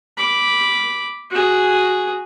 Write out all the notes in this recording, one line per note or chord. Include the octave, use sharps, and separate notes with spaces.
B5 D6
F#4 G#4